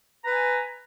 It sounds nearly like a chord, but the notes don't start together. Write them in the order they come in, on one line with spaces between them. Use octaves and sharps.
A#5 B4 G#5